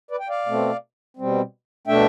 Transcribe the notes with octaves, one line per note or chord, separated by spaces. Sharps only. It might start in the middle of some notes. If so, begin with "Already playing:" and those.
B4 D5
G5
D5 F5
B2 A3 C4
B2 G3 C4
B2 A3 D4 E5 G5